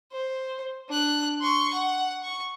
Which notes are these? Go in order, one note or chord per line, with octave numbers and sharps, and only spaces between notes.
C5
D4 F#6
C6 C#6
F#5
C#6